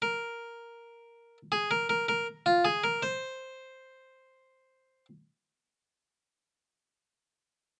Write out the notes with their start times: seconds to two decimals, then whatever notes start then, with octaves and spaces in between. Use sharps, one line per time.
0.02 A#4
1.52 G#4
1.71 A#4
1.89 A#4
2.08 A#4
2.46 F4
2.65 G#4
2.84 A#4
3.03 C5